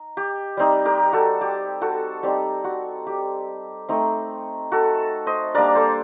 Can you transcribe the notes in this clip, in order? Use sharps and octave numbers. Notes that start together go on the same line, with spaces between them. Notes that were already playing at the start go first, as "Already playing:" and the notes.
Already playing: D#4
G4
G3 C4 D#4
G4 A#4
F#4 A4
G4
F#4 A4
G3 C4 D#4 G4
F#4
G4
A3 C4 D#4
F#4 A4
C5 D#5
G3 A#3 D4 A#4 D5
A4 C5